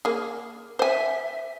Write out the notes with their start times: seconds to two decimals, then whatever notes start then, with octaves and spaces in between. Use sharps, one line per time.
0.05 A#3 G#4
0.79 C5 E5 G#5